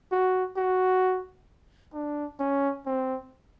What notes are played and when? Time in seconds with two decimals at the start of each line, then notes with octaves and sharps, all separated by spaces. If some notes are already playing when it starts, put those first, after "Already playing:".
0.12 F#4
0.57 F#4
1.94 D4
2.39 C#4
2.86 C4